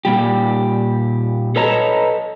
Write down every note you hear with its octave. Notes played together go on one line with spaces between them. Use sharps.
A#2 G3 G4
A4 B4 C#5 D#5 A5 A#5